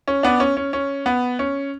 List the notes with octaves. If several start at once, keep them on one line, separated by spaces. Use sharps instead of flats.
C#4
B3 D4
C#4
C#4
C#4
B3
C#4